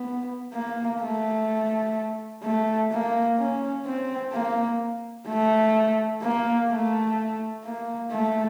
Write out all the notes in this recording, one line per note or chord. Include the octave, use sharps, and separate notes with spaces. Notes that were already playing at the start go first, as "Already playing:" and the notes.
Already playing: B3
A#3
A3
A3
A#3
C#4
C4
A#3
A3
A#3
A3
A#3
A3